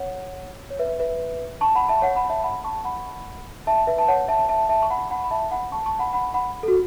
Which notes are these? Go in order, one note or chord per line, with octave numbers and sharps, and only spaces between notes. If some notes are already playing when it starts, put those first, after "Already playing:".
Already playing: C#5 F#5
C#5
B4 E5
B4 E5
A5 C#6
F#5 B5
E5 A5
C#5 F#5
F#5 B5
E5 A5
F#5 B5
A5 C#6
F#5 B5
E5 A5
B4 E5
A5
C#5 F#5
E5 A5
E5 A5
E5 A5
C#6
F#5 B5
F#5 B5
B5
E5 A5
F#5 B5
A5 C#6
A5 C#6
F#5 B5
F#5 B5
F#5 B5
A4
F#4